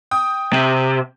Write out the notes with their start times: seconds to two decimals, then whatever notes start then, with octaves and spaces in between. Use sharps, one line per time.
0.11 G5 D#6
0.53 C3